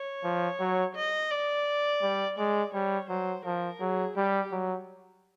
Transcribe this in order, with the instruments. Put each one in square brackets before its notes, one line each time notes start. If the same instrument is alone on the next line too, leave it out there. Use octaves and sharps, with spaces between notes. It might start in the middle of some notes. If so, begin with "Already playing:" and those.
Already playing: [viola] C#5
[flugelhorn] F3
F#3
[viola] D#5
D5
[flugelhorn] G3
[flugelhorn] G#3 [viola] D5
[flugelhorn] G3 [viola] C#5
[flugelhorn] F#3 [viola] C5
[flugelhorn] F3 [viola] A#4
[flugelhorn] F#3 [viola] G#4
[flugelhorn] G3 [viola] G4
[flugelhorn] F#3